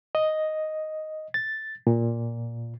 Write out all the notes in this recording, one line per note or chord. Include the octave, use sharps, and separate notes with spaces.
D#5
A6
A#2